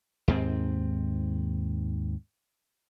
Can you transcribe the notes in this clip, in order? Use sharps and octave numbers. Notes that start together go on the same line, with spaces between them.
D#2 G#2 C4